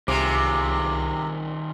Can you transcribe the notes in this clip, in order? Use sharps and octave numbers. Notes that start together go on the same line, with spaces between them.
C2 C3 D#3 F4 G#4 D6